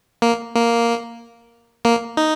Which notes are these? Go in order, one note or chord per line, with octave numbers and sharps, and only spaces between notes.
A#3
A#3
A#3
D#4